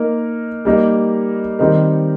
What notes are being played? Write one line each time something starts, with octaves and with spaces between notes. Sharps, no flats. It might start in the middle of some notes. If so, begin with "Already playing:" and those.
Already playing: A#3 D#4 A#4
G3 A#3 D#4 A#4
D#3 G3 C4 D#4 A#4